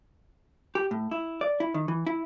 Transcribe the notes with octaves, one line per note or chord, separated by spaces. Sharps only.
G4
A2
E4
D5
E4
D#3
E3
E4